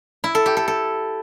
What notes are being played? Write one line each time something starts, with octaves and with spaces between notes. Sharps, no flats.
E4
A4
G4
A4
A4